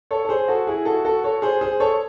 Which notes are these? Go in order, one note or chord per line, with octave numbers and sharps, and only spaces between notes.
A4 C#5
A4
G#4 C5
F#4 A4
E4 G#4
F#4 A4
F#4 A4
A4 C#5
G#4 C5
G#4 C5
A4 C#5